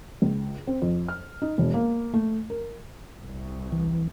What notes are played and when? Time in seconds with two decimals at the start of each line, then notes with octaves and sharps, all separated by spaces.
0.22 C#2
0.67 C4
0.82 F2
1.08 F6
1.42 D#4
1.58 E1
1.74 A#3
2.14 A3
2.50 A#4
3.20 C2
3.72 E3